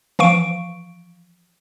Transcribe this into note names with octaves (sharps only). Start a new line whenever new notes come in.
E3 F3 F5 C#6 D7